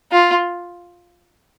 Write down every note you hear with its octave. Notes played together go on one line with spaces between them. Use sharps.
F4